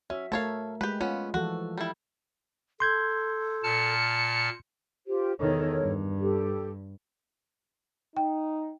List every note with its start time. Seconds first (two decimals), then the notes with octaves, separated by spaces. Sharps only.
0.10 C#4 F#4 E5
0.32 A3 A4 A#4 C#5 F5
0.81 G#3 G4 B4
1.01 B3 C#4 F4
1.34 E3 F3 F#4 A4
1.78 G3 E4
2.80 A4 C6 G6 G#6
3.64 A#2 A5 F6 C#7
5.07 F4 G4 C5
5.39 E2 D#3 A4 A#4 C#5
5.81 G2
6.20 G4 A4
8.17 D#4 G5